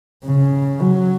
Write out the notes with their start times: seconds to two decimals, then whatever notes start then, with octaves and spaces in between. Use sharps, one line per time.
0.25 C#3
0.82 F#3